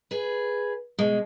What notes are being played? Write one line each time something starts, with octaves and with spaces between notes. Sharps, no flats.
G#4 B4
B2 G#3